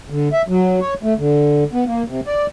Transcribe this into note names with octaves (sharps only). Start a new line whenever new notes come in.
D3
E5
F#3
C#5
A3
D3
B3
A#3
C3
D5